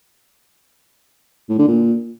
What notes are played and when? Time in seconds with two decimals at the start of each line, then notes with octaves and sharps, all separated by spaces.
1.49 A2
1.59 D3
1.68 A#2